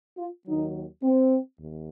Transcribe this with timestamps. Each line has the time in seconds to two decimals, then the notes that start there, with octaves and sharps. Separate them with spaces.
0.18 F4
0.47 D#2 D#3 F#3 D#4
1.03 C4
1.60 D#2